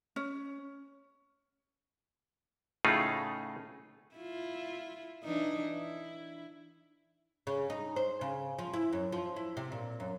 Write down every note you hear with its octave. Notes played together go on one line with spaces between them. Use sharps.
C#4
A2 C#3 A3 D#4 F4 G#4
E4 F4
E3 D4 D#4
E4
C#3
D#4
C5
C#3
F3
E4
F#2
F3
E4
C3
A#2
F#2